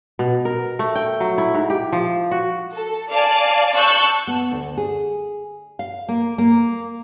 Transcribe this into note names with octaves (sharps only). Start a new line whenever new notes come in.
B2
A#4
A3
G5
F#3
E4
G#2
G4
F3
F#4
A4
D5 F5 G#5 A5
A5 C#6 E6 F#6 G6
B3
D2
G#4
F5
A#3
A#3